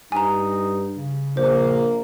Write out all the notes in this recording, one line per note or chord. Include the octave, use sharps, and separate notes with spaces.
G2 D#4 G#5 A#5
C#3
A#1 A#3 A#4 C5